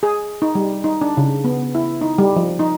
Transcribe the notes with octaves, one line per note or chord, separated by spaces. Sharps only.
G#4
D#4
G3
D#4
D4
C#3
B3
E4
D#4
G3
F3
D#4